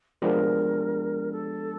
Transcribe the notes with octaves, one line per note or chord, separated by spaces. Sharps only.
F3 G#3 B3 D4 G4 A#4
A4